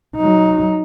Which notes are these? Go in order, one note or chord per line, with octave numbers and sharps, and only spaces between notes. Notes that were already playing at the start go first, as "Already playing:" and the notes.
F#3 D#4